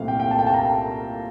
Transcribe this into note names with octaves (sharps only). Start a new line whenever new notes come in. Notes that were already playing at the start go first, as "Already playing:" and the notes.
Already playing: C2 A#2 A3 C4 E4 F5
G5
G5
A5
G5
A5
A#5